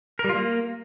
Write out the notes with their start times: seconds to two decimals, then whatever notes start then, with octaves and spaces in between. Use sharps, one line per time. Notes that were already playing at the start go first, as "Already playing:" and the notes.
0.19 A#4
0.24 G3
0.29 F4
0.34 A#3